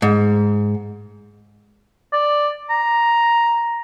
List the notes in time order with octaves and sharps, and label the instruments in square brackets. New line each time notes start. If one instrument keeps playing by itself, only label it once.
[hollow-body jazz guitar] G#2
[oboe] D5
A#5